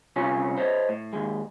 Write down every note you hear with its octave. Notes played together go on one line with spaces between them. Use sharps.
C2 C3 C#4 F4 C#5 G#5
C5 C#5 D#5 G#5 A5
A2
D#2 G#3